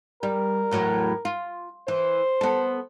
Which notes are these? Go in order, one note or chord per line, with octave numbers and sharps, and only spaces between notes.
G3 A#4
E2 A2 F#3
F4
E3 C5
B3 A4